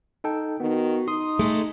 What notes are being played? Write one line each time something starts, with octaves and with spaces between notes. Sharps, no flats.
D#4 A4 G5
D#3 B3 F#4
D#4 C6 D#6
G#3 A3